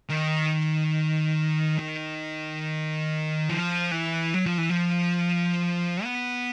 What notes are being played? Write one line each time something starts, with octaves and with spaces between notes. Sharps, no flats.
D#3
D#3
F3
E3
F#3
F3
E3
F3
B3